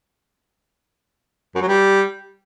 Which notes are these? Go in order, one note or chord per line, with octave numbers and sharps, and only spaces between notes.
F#2
F#3
G3